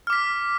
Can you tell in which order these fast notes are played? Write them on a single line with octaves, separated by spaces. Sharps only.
F6 D6 B6